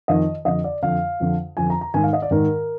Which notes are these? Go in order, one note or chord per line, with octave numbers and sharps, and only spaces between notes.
F2 D#3 D#5
F2 D3 D#5
D5
F2 D3 F5
F2 D3
F2 D3 G#5
A#5
A#5
G#2 D#3 G#5
F5
D#5
D5
G#2 D#3 A#4